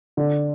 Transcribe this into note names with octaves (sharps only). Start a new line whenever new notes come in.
D3